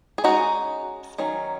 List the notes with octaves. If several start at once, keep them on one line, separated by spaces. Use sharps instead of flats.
G#4
G#3 C#4 D#4 F#4
D#3 F#3 C#4